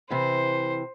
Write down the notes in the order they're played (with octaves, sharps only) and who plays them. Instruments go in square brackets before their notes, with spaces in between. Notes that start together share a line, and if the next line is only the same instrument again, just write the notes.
[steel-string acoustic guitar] C3 E3 [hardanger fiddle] C5